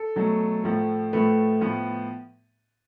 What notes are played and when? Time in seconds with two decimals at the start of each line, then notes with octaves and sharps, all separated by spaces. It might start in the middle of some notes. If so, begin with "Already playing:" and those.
Already playing: A4
0.16 B2 F#3 A3
0.64 A2 F3 A3
1.13 A2 F3 A3 B4
1.61 A2 F3 B3